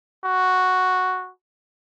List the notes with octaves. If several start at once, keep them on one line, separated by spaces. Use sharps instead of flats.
F#4